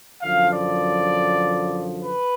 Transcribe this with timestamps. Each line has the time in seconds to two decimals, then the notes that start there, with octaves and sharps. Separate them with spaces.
0.22 F#2 D3 F3 F5
0.53 D5
2.03 B4